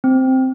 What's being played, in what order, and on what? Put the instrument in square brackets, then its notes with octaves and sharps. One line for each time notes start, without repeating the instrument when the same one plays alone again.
[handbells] C4